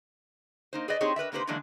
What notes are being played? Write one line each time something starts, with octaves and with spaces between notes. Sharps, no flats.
A#3 D#4 C5
G#4 B4 C5 D5 D#5
C4 D#4 G4 G#4 C5 C#5
A#4 B4 D5 E5
C3 A#3 D#4 G4 B4 C5
D3 E3 F#3 G#3 A#3 D4